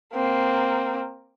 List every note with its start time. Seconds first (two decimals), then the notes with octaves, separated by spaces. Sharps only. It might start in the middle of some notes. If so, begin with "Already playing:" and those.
0.14 A#3 C4